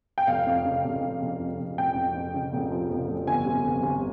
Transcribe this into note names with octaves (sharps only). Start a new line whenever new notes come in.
G5
F1 F5
F2
C#3
F1
C#3
F1
F2
F1
F1 G5
F2
F2
C#3
F1
F3
F1
F1
G1 G#5
C3
G1
G1